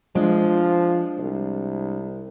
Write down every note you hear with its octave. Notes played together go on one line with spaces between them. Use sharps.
F3 G#3 D4
C2